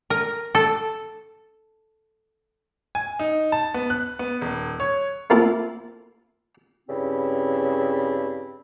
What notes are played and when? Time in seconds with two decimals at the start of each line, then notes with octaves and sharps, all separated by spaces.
0.10 A#4
0.55 A4
2.95 G#5
3.19 D#4
3.52 A5
3.74 B3
3.90 F#6
4.19 B3
4.41 D#1
4.80 C#5
5.30 A3 A#3 C4 E4 F4 A4
6.89 G2 C#3 C4 E4